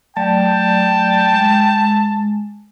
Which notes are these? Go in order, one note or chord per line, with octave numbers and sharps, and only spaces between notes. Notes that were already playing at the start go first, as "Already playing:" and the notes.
F#3 A3 D5 G5 A5
G#3